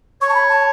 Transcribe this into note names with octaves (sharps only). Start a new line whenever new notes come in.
C#5 C#6
A5
B5
A5